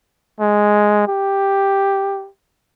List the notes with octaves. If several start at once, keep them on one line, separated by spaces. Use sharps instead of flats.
G#3
G4